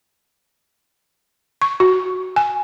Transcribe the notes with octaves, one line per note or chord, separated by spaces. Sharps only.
C#6
F#4
G#5